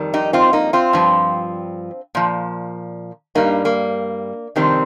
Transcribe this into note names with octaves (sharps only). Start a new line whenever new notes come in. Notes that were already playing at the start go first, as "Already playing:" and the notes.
Already playing: F2 D#3 G3
D#4 G4
C4 F4
A#3 D#4
C4 F4
G2 F3
A#2 F3
G2 G3 A#3 D#4
A#3
F2 C3 D#3 G3 C4